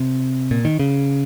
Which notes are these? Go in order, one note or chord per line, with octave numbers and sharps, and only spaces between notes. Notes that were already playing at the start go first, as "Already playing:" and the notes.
Already playing: C3
A#2
D#3
C#3